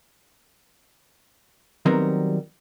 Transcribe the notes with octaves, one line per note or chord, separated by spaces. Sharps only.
D#3 F#3 G3 B3 C4 A#4